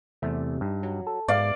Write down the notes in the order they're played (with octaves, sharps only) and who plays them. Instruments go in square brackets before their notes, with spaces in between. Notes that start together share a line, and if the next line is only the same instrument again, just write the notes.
[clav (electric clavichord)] E2 A3 [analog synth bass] C3
[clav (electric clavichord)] G2 D#4
[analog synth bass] F#3
[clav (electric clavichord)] A4
[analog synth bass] G#2 [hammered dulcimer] D5 F5 D6